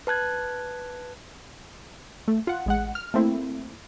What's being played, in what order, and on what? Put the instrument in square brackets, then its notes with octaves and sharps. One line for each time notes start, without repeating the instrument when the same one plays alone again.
[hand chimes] B4 A5 F#6 G#6
[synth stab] A3
F4 F#5
A1 G#3 F#5
F6
A3 A#3 C4 E4